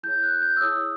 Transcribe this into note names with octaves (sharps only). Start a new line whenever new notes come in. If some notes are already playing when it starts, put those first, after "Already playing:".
E4 G#4 C#5 G6
F#6
F#6
G6
E6
E4 G#4 C#5 D#6